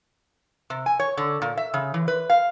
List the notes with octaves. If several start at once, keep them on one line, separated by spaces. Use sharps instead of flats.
C3
G#5
C#5
D3
A#2
E5
C#3
E3
B4
F5